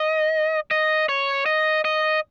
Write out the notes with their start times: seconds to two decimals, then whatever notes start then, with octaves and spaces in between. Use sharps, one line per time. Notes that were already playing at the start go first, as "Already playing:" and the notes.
Already playing: D#5
0.71 D#5
1.09 C#5
1.46 D#5
1.85 D#5